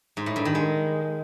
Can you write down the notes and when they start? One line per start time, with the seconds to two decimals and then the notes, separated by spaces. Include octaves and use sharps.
0.17 G#2
0.26 A2
0.36 G2
0.45 D#3
0.55 G#3